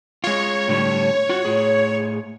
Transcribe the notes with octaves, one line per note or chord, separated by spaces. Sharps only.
G#3 F4 C#5
A2 D3 G3
F4 F#4
A2 G#4